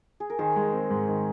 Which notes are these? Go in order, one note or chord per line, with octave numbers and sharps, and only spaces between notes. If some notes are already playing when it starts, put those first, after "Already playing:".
G#4
A#4
D#3 G#4 C5
G#3
C4
G#2
D#3